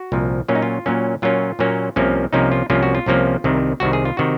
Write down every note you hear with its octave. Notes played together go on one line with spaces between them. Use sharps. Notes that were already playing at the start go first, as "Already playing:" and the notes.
Already playing: F#4
C2 A#2 F3
A#2 F#3 A#3 C#4 F4
D#4
F4
A#2 F#3 A#3 C#4
A#2 F#3 A#3 C#4 F4
A#2 F#3 A#3 C#4
C2 C3 F3 A#3 C#4
C2 C3 F3 A#3 C#4 D#4
F4
C2 C3 F3 A#3 C#4 F4
F#4
F4
C2 C3 F3 A#3 C#4
C2 C3 D#3
C2 C3 D#3 F#4
G#4
F4
C3 D#3 F#4